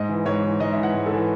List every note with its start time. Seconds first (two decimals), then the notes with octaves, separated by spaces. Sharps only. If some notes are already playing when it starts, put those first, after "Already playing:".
Already playing: G#2 D#5
0.09 E3
0.25 G#2 C#5
0.43 E3
0.59 G#2 D#5
0.72 E5
0.78 E3
0.83 F#5
0.94 G#2
1.06 A4
1.12 E3